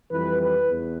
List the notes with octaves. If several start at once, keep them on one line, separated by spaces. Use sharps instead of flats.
F2 E3 G3 B4
B4
E2